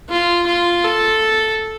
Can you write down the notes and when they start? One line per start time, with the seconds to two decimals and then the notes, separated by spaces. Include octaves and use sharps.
0.09 F4
0.47 F4
0.84 A4